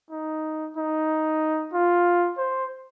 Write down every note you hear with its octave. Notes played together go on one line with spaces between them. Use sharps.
D#4
D#4
F4
C5